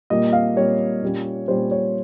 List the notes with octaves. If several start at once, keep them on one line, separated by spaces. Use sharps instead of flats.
A#2 G3 A#3 D#5
F5
A#2 G3 A#3 C#5
A#2 G3 C#4
A#2 G3 C#4 C5
C#5